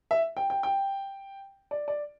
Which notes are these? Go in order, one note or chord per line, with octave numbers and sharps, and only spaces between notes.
E5
G5
G5
G5
D5
D5